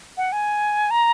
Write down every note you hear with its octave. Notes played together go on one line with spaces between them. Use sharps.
F#5
G#5
A#5